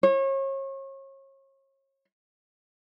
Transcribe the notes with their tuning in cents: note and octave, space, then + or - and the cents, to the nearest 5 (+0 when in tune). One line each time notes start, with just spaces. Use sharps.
C#5 -35